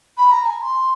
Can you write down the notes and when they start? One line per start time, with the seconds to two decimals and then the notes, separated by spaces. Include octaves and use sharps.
0.17 B5
0.31 A#5
0.46 G#5
0.61 C6